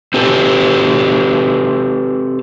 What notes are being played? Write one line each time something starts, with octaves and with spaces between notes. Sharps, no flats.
C4 G4 A4 B4